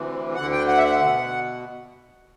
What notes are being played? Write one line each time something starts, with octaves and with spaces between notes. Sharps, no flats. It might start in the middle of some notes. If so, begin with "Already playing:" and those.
Already playing: D2 C3 E3
D2 D3 F#5
G5
F#5
E5
F#5
B2